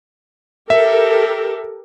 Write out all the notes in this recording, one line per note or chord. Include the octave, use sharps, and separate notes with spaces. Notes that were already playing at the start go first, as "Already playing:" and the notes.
G4 A4 A#4 E5